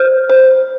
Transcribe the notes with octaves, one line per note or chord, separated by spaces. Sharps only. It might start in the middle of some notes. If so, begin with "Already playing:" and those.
Already playing: C5 F6 G6
C5